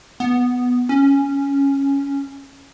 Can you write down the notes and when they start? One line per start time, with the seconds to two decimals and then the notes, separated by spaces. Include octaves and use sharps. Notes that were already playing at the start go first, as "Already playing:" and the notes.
0.20 B3
0.89 C#4